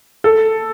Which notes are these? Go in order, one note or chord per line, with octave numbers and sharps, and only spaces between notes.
A4